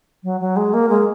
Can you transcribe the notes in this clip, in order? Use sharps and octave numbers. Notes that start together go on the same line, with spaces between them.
F#3
F#3
G#3
A#3
G#3